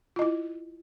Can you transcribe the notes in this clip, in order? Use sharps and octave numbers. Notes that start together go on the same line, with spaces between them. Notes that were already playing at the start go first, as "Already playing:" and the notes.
E4 F4 D#5